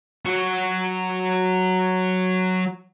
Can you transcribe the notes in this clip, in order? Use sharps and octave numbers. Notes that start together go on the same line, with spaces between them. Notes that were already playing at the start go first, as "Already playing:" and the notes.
F#3 F#4